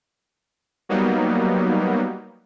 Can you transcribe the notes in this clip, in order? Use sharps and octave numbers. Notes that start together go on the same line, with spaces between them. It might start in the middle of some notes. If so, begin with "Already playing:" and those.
F#3 G3 A#3 B3 D#4